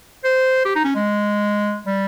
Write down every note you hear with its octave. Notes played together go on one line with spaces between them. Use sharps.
C5
G4
D#4
C#4
G#3
G3